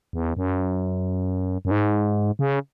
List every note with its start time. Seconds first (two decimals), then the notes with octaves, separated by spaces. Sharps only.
0.13 E2
0.37 F#2
1.65 F#2
1.71 G#2
2.39 C#3